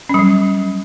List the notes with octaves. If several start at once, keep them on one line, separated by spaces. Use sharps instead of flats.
F#3 G3 C#4